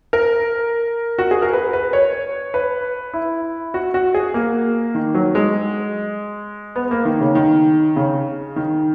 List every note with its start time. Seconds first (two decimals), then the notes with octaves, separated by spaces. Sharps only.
0.13 A#4
1.18 F#4
1.31 G#4
1.42 A#4
1.53 B4
1.73 B4
1.93 C#5
2.54 B4
3.14 E4
3.74 F#4
3.94 F#4
4.14 G#4
4.34 A#3
4.95 D#3
5.15 F#3
5.35 G#3
6.76 B3
6.91 A#3
7.05 D#3
7.21 C#3
7.35 D#3
7.96 C#3
8.56 D#3